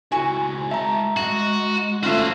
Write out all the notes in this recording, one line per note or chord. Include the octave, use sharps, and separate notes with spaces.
C#2 E4 F#4 G#5
G#3 E5 A5 A#5
G#3 F#4 D#5
A3 C#4 F4 F#4 C5